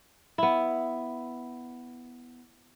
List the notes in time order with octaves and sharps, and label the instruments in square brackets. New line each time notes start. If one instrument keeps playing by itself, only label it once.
[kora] B3 E4